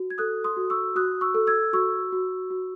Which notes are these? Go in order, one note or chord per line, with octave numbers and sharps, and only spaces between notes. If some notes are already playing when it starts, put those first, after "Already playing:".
Already playing: F#4
G#6
A4 D#6 F#6
C6 D#6
F#4
C#6 E6
F#4 D#6 F#6
C#6 E6
A4
E6 G#6
F#4 C#6 E6
F#4
F#4